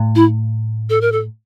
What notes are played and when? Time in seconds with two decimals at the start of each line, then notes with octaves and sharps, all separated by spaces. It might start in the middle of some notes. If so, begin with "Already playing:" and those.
Already playing: A2
0.15 E4
0.90 A4
1.01 A#4
1.12 A4